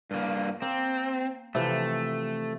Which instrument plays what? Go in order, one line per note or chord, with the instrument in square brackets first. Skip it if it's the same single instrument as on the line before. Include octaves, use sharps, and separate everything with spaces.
[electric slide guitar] G2 A#3
[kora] A#3 [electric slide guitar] C4
[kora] C3 E3 F3 [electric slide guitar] A3